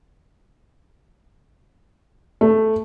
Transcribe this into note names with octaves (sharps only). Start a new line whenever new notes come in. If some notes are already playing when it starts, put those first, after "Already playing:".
A3